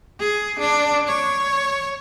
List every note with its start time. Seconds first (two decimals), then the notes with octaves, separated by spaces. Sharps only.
0.20 G#4
0.60 D4
1.07 C#5